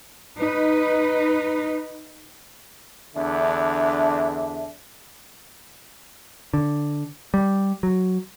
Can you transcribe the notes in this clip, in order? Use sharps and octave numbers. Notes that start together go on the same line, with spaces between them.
D#4 B4
E2 D3 D4 E5
D3
G3
F#3